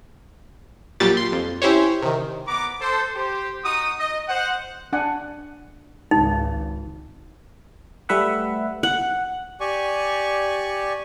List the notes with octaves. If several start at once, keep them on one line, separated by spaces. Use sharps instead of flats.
A#1 A#2 F#3 G3 G4 A6
C6
F2
C#4 E4 G4 C5 C#5
C3 D#3
B3 A#5 D6
A4 C5
G4 C5
D#4 F#4 D#6
D#5
C5 F#5
D4 F#5 G#5
G#1 C#2 D#4
G3 A3 B4 E5 F#5
F#5
G4 D5 G#5 C#6